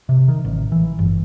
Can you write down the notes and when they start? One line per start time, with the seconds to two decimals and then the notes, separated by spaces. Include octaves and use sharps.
0.09 C3
0.28 D#3
0.45 A1
0.72 E3
0.99 G1